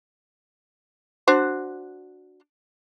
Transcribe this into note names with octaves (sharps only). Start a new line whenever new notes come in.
D4 F#4 C5